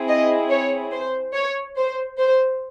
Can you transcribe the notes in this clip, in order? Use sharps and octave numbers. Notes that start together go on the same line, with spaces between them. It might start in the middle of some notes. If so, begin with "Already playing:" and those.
Already playing: C4 E4 G#4
D#5
C#5
C5
C#5
C5
C5